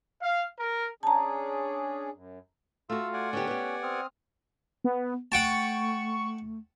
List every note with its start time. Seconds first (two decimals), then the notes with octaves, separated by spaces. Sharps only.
0.21 F5
0.58 A#4
1.03 C#4 D4 G#4 A5 A#5
2.13 F#2
2.90 A3 F4 F#4 E6
3.13 D5 F#5 G#5
3.33 D3 B3 C#4 G4
3.47 B3 G4
3.83 C4 D#6 F6
4.84 B3
5.32 A3 F#5 G5 A5 C#6